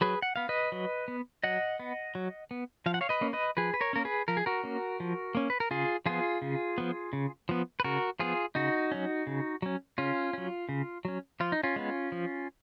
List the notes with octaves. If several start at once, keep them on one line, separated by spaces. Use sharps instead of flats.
F#3 G#4 B4
F#5
B3 F5
B4 D#5
F#3
B3
F#3 D#5 F#5
B3
F#3
B3
F3 F5
F#5
C#5 F5
B4 D#5
A#3 C#4
B4 D#5
F3 G#4 B4
B4
A#4 C#5
A#3 C#4 A#4
G#4 B4
F3 A#4
G#4
F#4 A#4
A#3 C#4
F3
A#3 C#4
B4
A#4
C#3 F4 G#4
F3 B3 F4 G#4
C#3
F3 B3
C#3
F3 B3
B4
C#3 F#4 A#4
F3 B3 F4 G#4
C#3 D#4 F#4
F#3 C#4
C#3
F#3 C#4
C#3 C#4 F4
F#3 C#4
C#3
F#3 C#4
F3 F4
D#4
C#4 F4
G#3 B3
F3